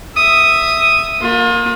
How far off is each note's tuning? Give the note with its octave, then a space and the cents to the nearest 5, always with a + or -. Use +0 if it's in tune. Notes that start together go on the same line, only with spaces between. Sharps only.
E5 +0 D#6 +0
A#3 +0 F4 +35